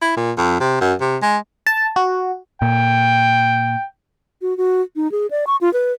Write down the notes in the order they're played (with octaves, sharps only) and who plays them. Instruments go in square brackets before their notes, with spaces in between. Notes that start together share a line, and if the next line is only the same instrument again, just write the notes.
[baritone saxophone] E4
A#2
F2
C3
F#2
C3
G#3
[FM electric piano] A5
F#4
[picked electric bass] A#2 [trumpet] G5
[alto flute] F#4
F#4
D#4
G#4
D5
C#6
F4
B4